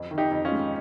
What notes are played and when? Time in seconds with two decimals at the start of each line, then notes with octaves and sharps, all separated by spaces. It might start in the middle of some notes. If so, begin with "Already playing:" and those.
Already playing: F2
0.11 D#3
0.18 D#4 G4
0.31 F2
0.45 C#4 F4
0.52 G#3